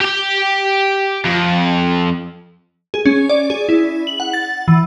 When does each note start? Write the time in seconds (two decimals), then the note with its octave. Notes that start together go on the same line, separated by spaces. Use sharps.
0.01 G4 G5
1.25 F2
2.94 G#4
3.05 C#4
3.29 D5
3.50 G#4
3.69 E4
4.07 F#7
4.20 F#5
4.33 A6
4.68 E3